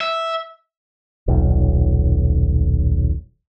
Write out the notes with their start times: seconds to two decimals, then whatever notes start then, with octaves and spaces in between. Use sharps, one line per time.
0.01 E5
1.28 D#1 B1